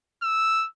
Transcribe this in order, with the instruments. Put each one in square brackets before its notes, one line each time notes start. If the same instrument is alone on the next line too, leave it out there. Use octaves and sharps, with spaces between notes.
[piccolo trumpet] E6